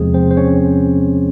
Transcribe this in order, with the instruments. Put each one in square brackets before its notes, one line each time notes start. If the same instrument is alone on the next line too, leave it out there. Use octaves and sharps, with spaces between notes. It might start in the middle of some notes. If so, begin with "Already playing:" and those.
Already playing: [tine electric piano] E2 C3 F3 G#3 C4 G#4
C4 C5
C5
C#4 C#5